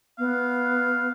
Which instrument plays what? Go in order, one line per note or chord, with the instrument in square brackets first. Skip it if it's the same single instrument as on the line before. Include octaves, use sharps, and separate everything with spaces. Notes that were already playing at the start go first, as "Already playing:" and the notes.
[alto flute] B3 [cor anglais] F5